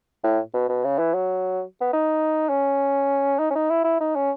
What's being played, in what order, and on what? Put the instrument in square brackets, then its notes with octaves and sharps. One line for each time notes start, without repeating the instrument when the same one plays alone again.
[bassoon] A2
B2
B2
C#3
E3
F#3
B3
D#4
C#4
D#4
C#4
D#4
E4
E4
D#4
C#4